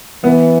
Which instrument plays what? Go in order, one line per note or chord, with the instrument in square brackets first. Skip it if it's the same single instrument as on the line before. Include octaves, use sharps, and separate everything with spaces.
[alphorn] E3 [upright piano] B3